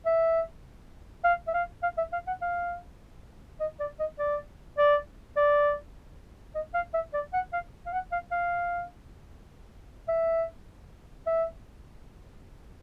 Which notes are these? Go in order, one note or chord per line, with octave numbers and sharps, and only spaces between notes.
E5
F5
E5
F5
F5
E5
F5
F#5
F5
D#5
D5
D#5
D5
D5
D5
D#5
F5
E5
D5
F#5
F5
F5
F#5
F5
F5
E5
E5